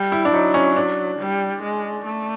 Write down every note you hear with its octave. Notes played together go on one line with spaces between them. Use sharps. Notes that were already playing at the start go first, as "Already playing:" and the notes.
Already playing: G3
E4
D4
F#3 D#4
C#4
D4
G3
G#3
A3